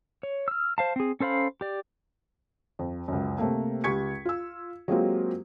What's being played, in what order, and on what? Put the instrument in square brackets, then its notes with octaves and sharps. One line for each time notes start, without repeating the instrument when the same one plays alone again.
[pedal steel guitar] C#5
E6 F6
C5 F5 A5
C4 G#4
C#4 A4 C5 F5 B5
G4 D5
[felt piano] F2
C#2 F#2
C3 A3 A#3
C#2 G4 C#6 G#6 B6 C#7
F4 E6
F#3 G#3 A#3 C4 F4 G4